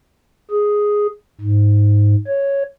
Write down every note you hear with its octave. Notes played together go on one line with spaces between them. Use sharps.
G#4
G#2
C#5